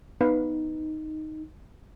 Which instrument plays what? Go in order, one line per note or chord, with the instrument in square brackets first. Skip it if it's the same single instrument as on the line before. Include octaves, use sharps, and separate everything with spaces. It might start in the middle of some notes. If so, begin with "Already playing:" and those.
[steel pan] B3 B4 F5 [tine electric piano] D#4